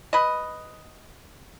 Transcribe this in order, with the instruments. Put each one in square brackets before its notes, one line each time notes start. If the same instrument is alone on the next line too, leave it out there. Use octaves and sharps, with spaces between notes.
[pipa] B4 D#5